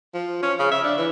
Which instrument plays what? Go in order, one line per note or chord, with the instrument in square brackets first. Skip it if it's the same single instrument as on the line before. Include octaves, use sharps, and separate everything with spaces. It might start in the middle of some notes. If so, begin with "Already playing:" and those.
[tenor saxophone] F3
C#4
C#3
E5
D4
E3